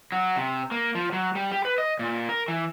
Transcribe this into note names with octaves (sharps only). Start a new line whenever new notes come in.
F#3
C3
A#3
F3
F#3
G3
G4
B4
D#5
A#2
A#4
E3